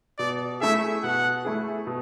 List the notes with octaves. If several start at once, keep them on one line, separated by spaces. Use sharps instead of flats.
B2 D5
A3 E4 G#4 E5
B2 F#5
A3 E4 G#4
B2